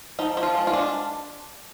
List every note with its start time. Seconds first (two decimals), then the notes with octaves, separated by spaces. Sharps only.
0.19 F3 D#4
0.37 F3
0.43 F4
0.55 G#3
0.67 F4
0.73 D4